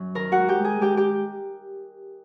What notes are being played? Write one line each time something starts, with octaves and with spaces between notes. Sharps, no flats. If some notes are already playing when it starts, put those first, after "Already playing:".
Already playing: F#2 F#3
D#3 A#4 A#5
F#4 F#5
G#2
G4 G5
G#3
G#4 G#5
G#3 G4 G5
G4 G5